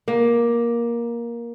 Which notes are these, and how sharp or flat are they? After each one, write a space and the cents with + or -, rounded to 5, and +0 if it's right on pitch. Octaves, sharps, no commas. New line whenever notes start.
A#3 +15